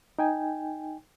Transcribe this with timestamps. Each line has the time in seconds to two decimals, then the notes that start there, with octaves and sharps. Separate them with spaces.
0.19 D#4 G5 G#5